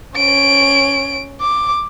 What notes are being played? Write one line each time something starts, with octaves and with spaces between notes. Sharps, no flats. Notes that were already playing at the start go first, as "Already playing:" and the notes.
C#4 D7
D6